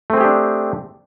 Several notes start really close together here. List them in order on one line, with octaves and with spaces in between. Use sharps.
A3 C4 G#4 G4 D4